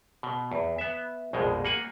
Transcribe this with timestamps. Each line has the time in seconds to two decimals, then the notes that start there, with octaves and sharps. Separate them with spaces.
0.23 B2
0.52 E2
0.78 B3 E5
1.33 A#1 F2 B2 G#3
1.65 A#3 F#5 G#5